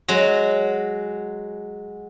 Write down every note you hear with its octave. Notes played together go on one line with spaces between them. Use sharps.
F#3 G#3